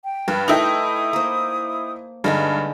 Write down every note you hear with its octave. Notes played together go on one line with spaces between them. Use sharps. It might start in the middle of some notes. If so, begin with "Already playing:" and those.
G5
G2 B4
A3 D#4 E4 D#5 G5 D#6
A#3 C5
G2 D3 G#3 D#4